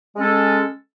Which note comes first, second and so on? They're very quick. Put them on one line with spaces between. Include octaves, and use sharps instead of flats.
G#3 C#4 A4